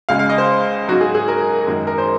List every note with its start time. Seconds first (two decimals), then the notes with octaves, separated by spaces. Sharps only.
0.09 C#2 C#3 G#3 F5
0.19 F5
0.30 D#5
0.38 C5
0.88 G#2 F#3 F#4
1.01 G#4
1.15 G#4
1.28 A#4
1.67 F#2 D#3 G#3
1.87 A#4
1.98 C5